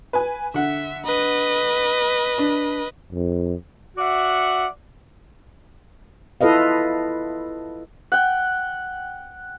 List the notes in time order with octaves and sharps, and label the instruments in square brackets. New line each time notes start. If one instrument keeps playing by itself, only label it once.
[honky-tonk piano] B4 G#5
[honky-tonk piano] D3 F#5 [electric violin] E5
[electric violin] B4 D#5
[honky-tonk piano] D4
[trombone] F2
[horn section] F#4 D5 E5 F#5
[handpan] E4 F4 A4 B4 D#5 F5
[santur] F#5 G5